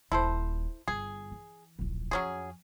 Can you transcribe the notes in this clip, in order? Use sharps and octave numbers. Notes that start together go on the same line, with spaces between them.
D#1 E4 A4 C5
G1 G#4
E3
D1 A#1
F2 F#3 C#4 G#4